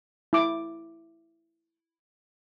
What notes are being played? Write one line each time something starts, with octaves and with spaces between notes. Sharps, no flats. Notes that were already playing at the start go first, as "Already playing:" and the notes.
E4 D6